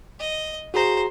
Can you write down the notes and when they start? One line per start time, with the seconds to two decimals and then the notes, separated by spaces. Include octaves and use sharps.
0.20 D#5
0.74 F#4 G#4 C5 A#5